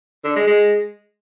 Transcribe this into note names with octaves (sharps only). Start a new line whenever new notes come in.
D3
G#3
G#3